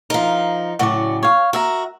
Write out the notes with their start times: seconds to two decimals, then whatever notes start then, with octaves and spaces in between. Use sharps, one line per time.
0.10 F3 D#4 A#4 F5
0.79 A2 C#3 F#3 F#4 D5
1.23 C#5 F5
1.53 F#4 A#4 E5 A#5